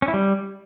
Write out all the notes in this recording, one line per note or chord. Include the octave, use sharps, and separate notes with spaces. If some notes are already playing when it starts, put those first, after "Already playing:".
C#4
E4
G3